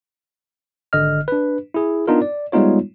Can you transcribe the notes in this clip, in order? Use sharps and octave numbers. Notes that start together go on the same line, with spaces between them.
G#1 D3 D#5 F6
D4 B4
E4 G#4
B3 D4 D#4 F4 A#4
D5
G3 G#3 B3 D#4 F4 C#5